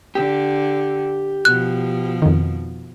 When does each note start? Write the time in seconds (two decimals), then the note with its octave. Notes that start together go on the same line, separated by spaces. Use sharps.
0.15 D3 G4
1.45 B2 F3 F#6
2.22 F2 D#3